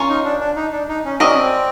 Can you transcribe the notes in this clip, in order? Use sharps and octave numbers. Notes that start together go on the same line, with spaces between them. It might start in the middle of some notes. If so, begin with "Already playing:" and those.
Already playing: C#4 F4 A#4 C#5
D#4
D4
D4
D#4
D4
D#4
C#4
C4 D4 F#4 A#4 D#5
C#4
C4